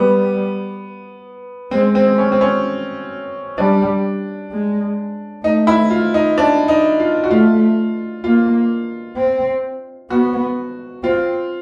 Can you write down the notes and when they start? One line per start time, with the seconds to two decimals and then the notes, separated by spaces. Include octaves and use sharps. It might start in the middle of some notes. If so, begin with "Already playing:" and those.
Already playing: G3 B3
1.71 G#3 C4
1.95 C4
2.18 C#4
2.32 C4
2.41 C#4
3.58 G3 D4
4.51 G#3
5.44 A3 D#4
5.67 E4
5.90 F4
6.14 D#4
6.38 D4
6.68 D#4
7.00 F4
7.24 F#4
7.31 A3 F4
8.24 A#3 F4
9.17 C4
10.10 B3 F#4
11.03 C4 F4